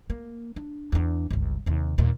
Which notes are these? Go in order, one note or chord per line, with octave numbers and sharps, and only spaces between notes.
A#3
D4
E2 D4
G1 C#2
D#2 C3
D#2 A#2